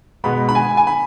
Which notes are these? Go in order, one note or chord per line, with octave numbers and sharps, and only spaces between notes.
B2 G#3 B3 B5
B5
G#5
G#5
B5